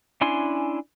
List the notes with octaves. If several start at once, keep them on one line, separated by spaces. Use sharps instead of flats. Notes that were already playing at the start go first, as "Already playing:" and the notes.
C#4 D4 E4 G#5 C6